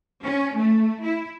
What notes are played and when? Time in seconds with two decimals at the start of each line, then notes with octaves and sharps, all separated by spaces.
0.23 C#4
0.57 A3
1.04 E4